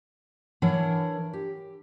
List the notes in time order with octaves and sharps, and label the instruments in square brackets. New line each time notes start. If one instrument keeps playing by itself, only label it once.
[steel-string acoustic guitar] E3 D4 A#4 C#5 F#5
G4